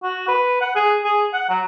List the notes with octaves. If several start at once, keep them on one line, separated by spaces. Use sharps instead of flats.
F#4
B4
F#5
G#4
G#4
F#5
F#3